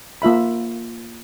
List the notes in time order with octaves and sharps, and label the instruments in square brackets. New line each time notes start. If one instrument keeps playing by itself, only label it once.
[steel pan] A#3 F4 E5 B5